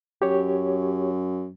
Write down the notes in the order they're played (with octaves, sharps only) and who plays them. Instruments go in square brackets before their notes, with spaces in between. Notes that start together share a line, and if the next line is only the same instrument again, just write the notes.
[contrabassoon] F#2 [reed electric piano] G4 C#5